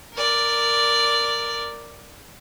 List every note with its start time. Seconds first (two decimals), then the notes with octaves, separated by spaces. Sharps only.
0.13 A#4 D5